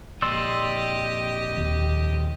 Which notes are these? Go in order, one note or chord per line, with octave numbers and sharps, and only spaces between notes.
F2 A#2 G4 D5 D#5 C6 E6
D#2